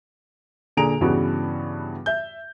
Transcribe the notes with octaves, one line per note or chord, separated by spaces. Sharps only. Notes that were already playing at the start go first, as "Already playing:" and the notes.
A#2 D3 G#4 A#5 D7 F7
G2 C#3 E3 B3 F#4
E5 G6